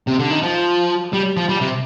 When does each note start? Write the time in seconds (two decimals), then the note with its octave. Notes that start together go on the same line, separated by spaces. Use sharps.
0.07 C3
0.19 D3
0.30 D#3
0.42 F3
1.13 G3
1.37 F3
1.49 G3
1.61 C3